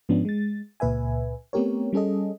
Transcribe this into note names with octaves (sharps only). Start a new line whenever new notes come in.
G#2 F3 B3 C#4 D4
G#3 A6
C#2 A#2 B4 E5 G#5
A3 B3 C4 G4 A#4 C#5
G3 C#4 G#4 A4 D#5